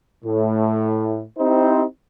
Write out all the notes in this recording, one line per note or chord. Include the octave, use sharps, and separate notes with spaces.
A2
C4 D#4 E4 G4 C5